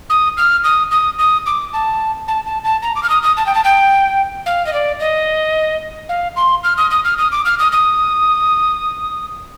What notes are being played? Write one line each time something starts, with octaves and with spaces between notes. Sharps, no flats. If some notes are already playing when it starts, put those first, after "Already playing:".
D#6
F6
D#6
D#6
D#6
D6
A5
A5
A5
A5
A#5
D6
F6
D#6
D#6
A5
G5
A5
G5
F5
D#5
D5
D#5
F5
C6
F6
D#6
D#6
F6
D#6
D6
F6
D#6
D#6